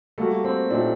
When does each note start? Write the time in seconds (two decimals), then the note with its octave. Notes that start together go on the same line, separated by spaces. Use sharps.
0.18 G3 A3 A#3 F#4
0.44 C4
0.70 A#2 F#3 A3 D4 D#4 G4